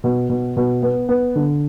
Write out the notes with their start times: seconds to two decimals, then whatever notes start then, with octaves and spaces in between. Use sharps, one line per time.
0.04 B2
0.29 B2
0.57 B2
0.83 B3
1.09 B3
1.36 D3